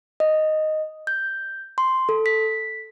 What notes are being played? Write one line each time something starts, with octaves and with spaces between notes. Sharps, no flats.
D#5
G6
C6
A4
B6